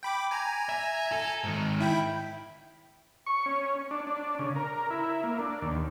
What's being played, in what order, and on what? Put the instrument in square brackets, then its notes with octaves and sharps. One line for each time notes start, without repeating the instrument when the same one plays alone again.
[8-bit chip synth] G5 B5 D6
G#5 A#5
[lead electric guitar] E5
A4
G#2 D#3
[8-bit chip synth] E4 G5 B5
[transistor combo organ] C#6
C#4
D4
D4
C#3
A#4
E4
A#3
D4
D#2